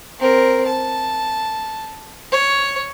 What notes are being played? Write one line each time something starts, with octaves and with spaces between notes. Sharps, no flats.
C4 A#4
A5
C#5